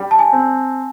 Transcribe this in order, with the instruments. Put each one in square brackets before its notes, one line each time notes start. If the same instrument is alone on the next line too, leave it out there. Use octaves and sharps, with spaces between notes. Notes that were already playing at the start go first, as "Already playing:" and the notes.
Already playing: [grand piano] G3
[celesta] A5
G#5
[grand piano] C4